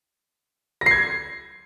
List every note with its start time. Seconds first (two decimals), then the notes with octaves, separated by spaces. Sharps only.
0.81 A#6
0.86 C7
0.91 G#6